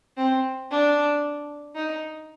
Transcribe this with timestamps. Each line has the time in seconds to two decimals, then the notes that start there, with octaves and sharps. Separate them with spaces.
0.17 C4
0.71 D4
1.75 D#4